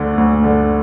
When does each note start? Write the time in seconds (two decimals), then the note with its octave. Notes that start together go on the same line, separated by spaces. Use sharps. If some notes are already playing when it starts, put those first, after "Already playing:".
Already playing: D2 D3
0.18 D2
0.44 D3